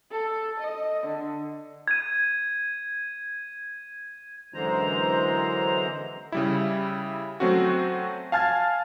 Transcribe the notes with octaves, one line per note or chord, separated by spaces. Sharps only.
A4
D#5
D3
G#6 D#7
F#2 D3 E3 G#3 C5 A#5
C#3 G3 E4
F#3 A3 C4 C#4 F#4
F5 G#5 A5 F6 G#6 A6